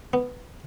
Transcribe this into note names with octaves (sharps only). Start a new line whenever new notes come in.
B3